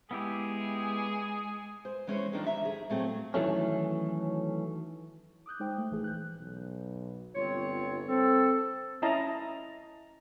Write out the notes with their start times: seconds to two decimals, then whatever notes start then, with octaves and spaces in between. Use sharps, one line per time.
0.11 G#3 B3 E4 G4 G#4
1.85 C5
2.07 E3 G#3 C#4 C5 C#5
2.32 D3 D#3 F3 A#3 D4 D#4
2.45 D3 E5 A#5
2.65 G#4
2.90 A#2 F#3 A3 C4 G#4
3.34 D#3 E3 F#3 A3 C#4
5.46 D6 D#6 F#6 G6
5.60 G#3 D#4 C5 G5
5.78 A3
5.91 A#1 E3 G#4
6.04 F#6 G6
6.39 B1
7.34 G1 C4 F4 C#5
8.08 C4 A4
9.02 C#4 E4 D#5 A5 A#5